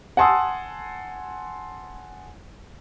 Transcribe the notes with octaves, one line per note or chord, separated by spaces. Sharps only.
F#5 G#5 A5 C6 D#6 E6